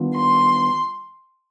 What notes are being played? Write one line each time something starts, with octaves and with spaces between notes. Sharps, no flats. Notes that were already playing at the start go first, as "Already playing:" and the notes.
Already playing: D#3 G3 B3 D4 F4
C6